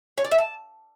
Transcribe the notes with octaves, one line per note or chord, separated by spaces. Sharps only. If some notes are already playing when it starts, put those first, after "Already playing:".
C#5
D5
E5
A5